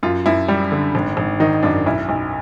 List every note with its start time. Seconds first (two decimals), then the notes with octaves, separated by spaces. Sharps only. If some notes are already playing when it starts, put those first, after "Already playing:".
0.03 F#2 F4
0.26 F#2 E4
0.48 G3
0.72 D3
0.95 G#1
1.17 G#1
1.40 D#3 D#4
1.63 F#2 D4
1.86 B1 E4
2.09 B1